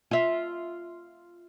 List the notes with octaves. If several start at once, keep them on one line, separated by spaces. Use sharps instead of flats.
F4 E5